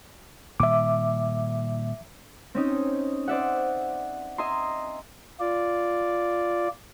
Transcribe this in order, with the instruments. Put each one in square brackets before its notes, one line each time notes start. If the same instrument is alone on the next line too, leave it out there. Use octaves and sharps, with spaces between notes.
[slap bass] A#2 D#3 G3 [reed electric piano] E5 D6
[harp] C4 C#4 D#4
C5 D5 E5 F#5
D#5 E5 G#5 A#5 C6
[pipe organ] F4 D5